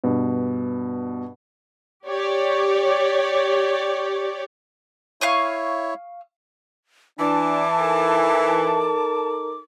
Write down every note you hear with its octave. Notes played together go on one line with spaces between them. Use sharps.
G2 B2
G4 C#5 D5
E4 C#5 F5 C#6 D#6
E3 D4 A5 D6
D#4 A4 A#4